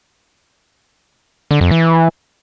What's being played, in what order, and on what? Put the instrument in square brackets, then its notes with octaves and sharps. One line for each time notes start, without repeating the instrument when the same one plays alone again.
[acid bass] D3
F2
E3